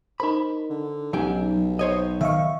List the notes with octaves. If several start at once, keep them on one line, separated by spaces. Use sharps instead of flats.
D#4 A#4 C5 B5
D3
B1 F#3 C#4 D#4 G4 G5
C5 C#5 D#5
D#3 E5 F5 C#6